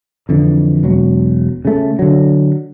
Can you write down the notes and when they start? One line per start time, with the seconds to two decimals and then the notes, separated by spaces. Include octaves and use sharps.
0.29 F2 D3 E3
0.84 E1 F#3
1.65 C#3 A3
1.99 D3 F#3